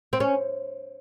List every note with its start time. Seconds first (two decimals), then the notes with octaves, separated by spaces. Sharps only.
0.13 C4
0.20 C#4